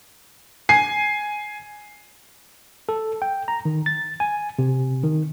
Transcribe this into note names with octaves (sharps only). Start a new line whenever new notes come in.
G#5 C7
A4
G5
A#5
D#3
A6
G#5
C3
D#3